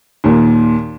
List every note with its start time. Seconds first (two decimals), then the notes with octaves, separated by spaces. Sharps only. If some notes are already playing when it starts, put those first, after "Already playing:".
0.24 D#2 A#2